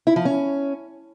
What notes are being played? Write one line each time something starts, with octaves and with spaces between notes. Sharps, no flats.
E4
F3
C#4